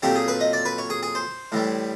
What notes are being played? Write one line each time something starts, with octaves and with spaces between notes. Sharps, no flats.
A#2 F#3 A3 C4 G4
G#4
B4
D#5
D5
B4
C#5
G#4
G#4
C5
A2 E3 G3